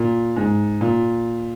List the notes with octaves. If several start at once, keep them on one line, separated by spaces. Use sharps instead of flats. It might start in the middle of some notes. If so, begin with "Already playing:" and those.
Already playing: A#2
G#2
A#2